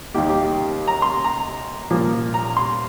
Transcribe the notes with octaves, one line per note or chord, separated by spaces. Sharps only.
D#2 D#3 A#3 G4
G4
G4
A#5
C6
A#5
A#2 F3 A#3
A#5
C6